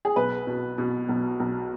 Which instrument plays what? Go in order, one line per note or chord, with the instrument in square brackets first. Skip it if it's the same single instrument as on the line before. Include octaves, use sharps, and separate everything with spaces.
[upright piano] G#4
B1 B4
B2
B2
B1
B1